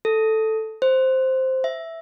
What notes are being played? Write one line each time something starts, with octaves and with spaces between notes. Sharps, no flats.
A4
C5
E5